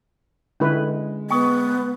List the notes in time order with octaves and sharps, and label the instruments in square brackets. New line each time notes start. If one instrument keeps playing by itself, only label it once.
[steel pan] D3 E4 B4 [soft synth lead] G#3 [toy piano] C#4
[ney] B3 [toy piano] G5 C#6 D#6